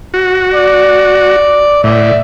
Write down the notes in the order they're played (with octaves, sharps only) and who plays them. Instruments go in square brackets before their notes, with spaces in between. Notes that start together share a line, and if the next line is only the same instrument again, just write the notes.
[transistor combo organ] F#4
[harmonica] D5
[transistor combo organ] A2 [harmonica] D5 E5